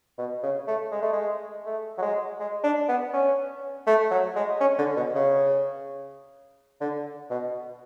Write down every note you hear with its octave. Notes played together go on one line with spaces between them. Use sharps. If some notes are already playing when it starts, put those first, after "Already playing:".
B2
C#3
A3
G#3
A3
G#3
A3
F#3
G#3
G#3
D4
B3
C#4
A3
F#3
G#3
C#4
D3
B2
C#3
D3
B2